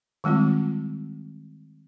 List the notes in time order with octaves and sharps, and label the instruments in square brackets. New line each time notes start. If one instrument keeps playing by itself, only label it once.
[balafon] D#3 G3 G#3 C4 F4